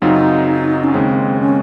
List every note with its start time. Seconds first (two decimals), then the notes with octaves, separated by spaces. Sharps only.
0.02 F#2 C#3 F#3 C4 D#4 F4
0.84 C#4
0.94 D#2 C#3 G#3 C4
1.40 C#4